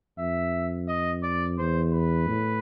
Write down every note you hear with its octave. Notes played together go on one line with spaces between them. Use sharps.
F2 E5
D#5
D5
E2 C5
B4
A2